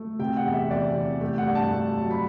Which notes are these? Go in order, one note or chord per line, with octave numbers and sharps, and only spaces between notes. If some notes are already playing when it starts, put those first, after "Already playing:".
Already playing: A3
C3 G5
F#5
E2
E5
E2 D5
C3
A3 G4
F#5
G2
A5
A3
F#3
B5